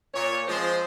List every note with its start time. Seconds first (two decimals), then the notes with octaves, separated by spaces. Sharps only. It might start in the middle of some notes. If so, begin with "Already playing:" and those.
0.14 A#2 C#5
0.48 F3 G#3 C4 C5